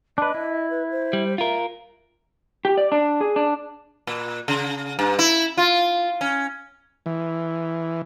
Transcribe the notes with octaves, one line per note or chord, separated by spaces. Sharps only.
D4 B4 D#5
E4
B4
C5
G3
F4 A#4 E5
G4
D5
D4
G#4
D4
A#2
C#3
G2
E4
F4
C#4
E3